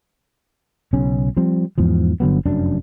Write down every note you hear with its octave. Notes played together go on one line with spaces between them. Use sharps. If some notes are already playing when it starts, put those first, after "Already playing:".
B1 C#3 C#4
F3 G3 C4
E2 G#2 F3
G1 D3 F#3 B3
F1 F#2 D4